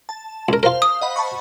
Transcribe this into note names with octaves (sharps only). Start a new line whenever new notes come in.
A5
C#2 A#4
F4 A#4 C5 F5
D#6
D#5 F#5 B5
A5 B5 C#6